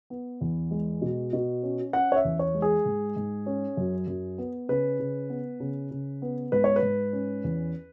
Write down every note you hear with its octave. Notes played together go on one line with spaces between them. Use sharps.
B3
E2
G#3
B2
B2
C#4
C#4 F#5
C#5
E5
E2
C#5
G#3
G#4
G#2
G#2
C#4
F#2
F#2
B3
C#3 B4
C#3
B3
C#3
C#3
B3
G#2 B4
C#5
B4
G#2
C#4
E2